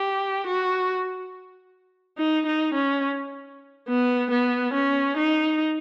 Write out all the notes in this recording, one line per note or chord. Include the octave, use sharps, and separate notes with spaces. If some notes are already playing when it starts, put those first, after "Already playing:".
Already playing: G4
F#4
D#4
D#4
C#4
B3
B3
C#4
D#4